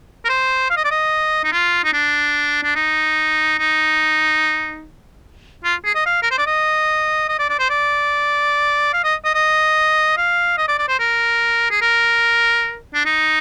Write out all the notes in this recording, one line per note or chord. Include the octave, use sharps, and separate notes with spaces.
A#4
C5
F5
D#5
D5
D#5
D#4
F4
D#4
D4
D4
D#4
D#4
F4
G#4
D#5
F5
A#4
C5
D5
D#5
D#5
D5
D5
C5
D5
F5
D#5
D#5
D#5
F5
D#5
D5
D5
C5
A#4
G#4
A#4
D4
D#4